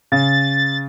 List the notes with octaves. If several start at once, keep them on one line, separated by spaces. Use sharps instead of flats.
C#3 A6